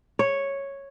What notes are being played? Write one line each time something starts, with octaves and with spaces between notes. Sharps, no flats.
C#5